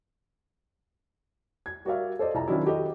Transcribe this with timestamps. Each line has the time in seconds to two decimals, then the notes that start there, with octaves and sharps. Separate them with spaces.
1.66 G#6
1.85 G3 F#4 A#4 D5 E5 F5
2.19 A4 C5 D5 D#5
2.34 C2 F2 A5 A#5
2.48 D#3 F3 F#3 C#4 D4 E4
2.66 F#4 G4 A4 D#5